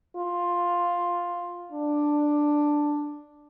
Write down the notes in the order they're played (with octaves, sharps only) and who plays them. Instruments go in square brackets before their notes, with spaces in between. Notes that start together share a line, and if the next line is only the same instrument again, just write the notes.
[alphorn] F4
D4